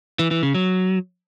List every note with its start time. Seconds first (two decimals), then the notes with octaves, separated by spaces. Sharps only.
0.19 E3
0.31 E3
0.43 C#3
0.55 F#3